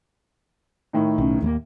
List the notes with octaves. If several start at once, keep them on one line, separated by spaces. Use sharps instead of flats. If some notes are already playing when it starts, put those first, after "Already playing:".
A2 D#3 D#4
B1 C#4
D#2 G3 A#3